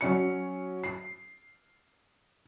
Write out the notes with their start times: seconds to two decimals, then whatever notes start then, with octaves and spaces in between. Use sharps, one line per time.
0.01 F#3 C#4 C#7
0.84 C7